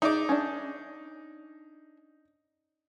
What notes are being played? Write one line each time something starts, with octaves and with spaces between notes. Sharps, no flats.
D#4 G#4 D5 E5 D6
C#4 D4